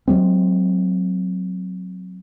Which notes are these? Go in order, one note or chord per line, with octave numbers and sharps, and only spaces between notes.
F#3 G#3 C4